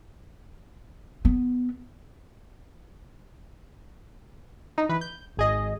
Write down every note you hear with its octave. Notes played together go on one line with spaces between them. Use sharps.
B3
D#4
E3 B4
G6
G#1 G#4 D#5